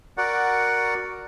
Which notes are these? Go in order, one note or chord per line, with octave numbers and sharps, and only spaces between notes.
F#4 A#4 D5 F#5